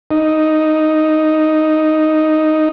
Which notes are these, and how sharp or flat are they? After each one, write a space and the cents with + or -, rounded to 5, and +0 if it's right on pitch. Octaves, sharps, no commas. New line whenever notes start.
D#4 +0